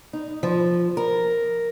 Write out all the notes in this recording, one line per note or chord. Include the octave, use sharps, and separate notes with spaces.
D#4
F3
A#4